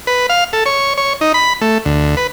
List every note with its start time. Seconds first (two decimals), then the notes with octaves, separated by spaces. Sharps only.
0.07 B4
0.29 F5
0.53 A4
0.66 C#5
0.98 C#5
1.21 D#4
1.34 B5
1.61 A3
1.86 D2
2.17 B4